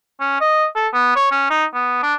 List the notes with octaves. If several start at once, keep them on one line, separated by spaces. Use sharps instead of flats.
C#4
D#5
A4
B3
C#5
C#4
D#4
B3
D4